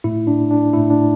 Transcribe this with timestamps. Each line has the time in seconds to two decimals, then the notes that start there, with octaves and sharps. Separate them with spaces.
0.04 A2 A3 E4
0.27 D4
0.51 D4
0.73 A2 A3 E4
0.90 D4